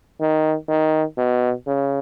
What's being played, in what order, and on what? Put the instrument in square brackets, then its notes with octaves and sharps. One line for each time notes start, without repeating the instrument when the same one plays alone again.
[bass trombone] D#3
D#3
B2
C#3